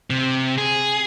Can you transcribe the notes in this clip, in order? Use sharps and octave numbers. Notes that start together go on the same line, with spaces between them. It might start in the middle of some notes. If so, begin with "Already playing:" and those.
C3
G#4